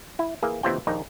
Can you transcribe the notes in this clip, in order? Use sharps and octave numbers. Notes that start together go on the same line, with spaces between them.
E4
E3 A#3 G#4
D#2 C3 E3 C4 F4 G5
A#1 D#2 D#4